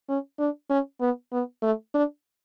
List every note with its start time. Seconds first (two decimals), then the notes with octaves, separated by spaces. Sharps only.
0.09 C#4
0.39 D4
0.70 C#4
1.01 B3
1.32 B3
1.62 A3
1.94 D4